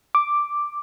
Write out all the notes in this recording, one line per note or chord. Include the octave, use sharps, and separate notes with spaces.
D6